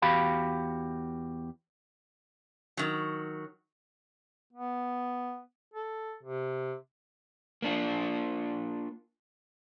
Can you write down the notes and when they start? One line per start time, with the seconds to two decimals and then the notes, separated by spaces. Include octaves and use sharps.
0.02 E2 F#4 G4 F5 B5
2.77 D#3 F#3
4.53 B3
5.74 A4
6.23 C3
7.62 A#3 D4 F4